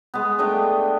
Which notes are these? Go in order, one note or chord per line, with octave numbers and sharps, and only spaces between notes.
G#3 B3
A3 D4 D#5 G5